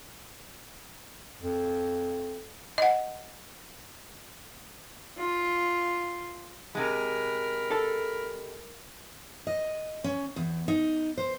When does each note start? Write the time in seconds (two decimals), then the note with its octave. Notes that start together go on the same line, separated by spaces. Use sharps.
1.41 F2
2.78 D#5 F#5
5.18 F4
6.75 C3 G#3 A#4 B5
7.70 A4 A5
9.47 D#5
10.04 C#4
10.36 E2
10.68 D#4
11.18 C5